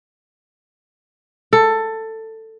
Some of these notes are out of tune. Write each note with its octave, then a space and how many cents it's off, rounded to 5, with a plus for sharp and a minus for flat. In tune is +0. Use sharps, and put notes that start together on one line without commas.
A4 +15